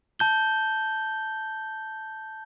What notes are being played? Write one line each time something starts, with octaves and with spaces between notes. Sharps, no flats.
A5 G6 G7